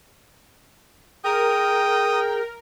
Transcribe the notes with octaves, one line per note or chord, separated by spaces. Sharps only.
G#4 A#4 G5 D#6